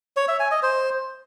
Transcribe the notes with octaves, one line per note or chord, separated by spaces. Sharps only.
C#5
E5
G#5
D#5
C5